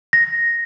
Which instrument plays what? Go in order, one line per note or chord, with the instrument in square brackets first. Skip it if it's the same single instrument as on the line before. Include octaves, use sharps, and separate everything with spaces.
[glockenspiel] A#6